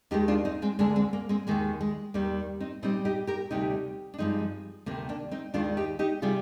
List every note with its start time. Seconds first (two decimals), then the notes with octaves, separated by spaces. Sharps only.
0.11 D#2 D#3 G#3 D#4 G4
0.28 D4 F4
0.45 C4 D#4
0.62 G#3 C4
0.79 D2 D3 G#3 A#3 D4
0.96 G#3 C4
1.13 A#3
1.29 G#3 C4
1.47 D#2 D#3 G#3 A#3
1.81 G#3
2.14 D#2 D#3 G3 A#3
2.60 C4 D#4
2.82 A#2 G3 C4 D#4
3.05 D#4 G4
3.27 G4 A#4
3.51 D2 C3 G3 D#4 G4
4.14 D4
4.18 G2 F3 G#3 C4 D#4
4.86 D2 C3 D#3 A#3
5.09 A#3 D4
5.31 C4 D#4
5.54 D#2 D#3 G#3 D4 F4
5.77 D#4 G4
5.99 D#4 G4
6.22 C3 G3 F4 G#4